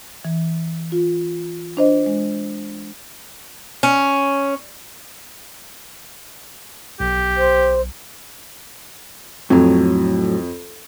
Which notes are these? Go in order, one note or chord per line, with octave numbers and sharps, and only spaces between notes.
E3
F4
D4 C5 D#5
G#3
C#4
B1 G4
C5
F2 A2 F#3